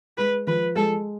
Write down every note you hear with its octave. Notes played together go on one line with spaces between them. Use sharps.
G#3 B4
F3 B4
G#3 A4